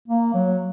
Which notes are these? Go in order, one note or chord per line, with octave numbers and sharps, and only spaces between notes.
A#3
F#3